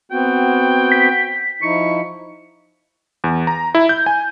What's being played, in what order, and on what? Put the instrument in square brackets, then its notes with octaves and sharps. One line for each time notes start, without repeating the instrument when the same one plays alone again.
[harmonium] B3 C4 F#4 [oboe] G5
[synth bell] B6
[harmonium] F3 D#4 E4 [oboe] C#6
[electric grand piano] E2
A#5
E4
G6
G#5